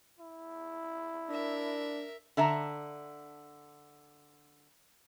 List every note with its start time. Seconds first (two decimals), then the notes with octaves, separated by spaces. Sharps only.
0.19 E4
1.30 D4 A#4 E5
2.37 D3 E5 A5 A#5